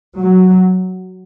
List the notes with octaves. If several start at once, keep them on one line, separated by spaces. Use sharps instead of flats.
F#3